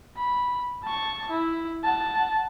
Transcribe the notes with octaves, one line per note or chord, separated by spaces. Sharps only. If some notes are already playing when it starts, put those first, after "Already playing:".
B5
A5 C#6
E4
F#5 A5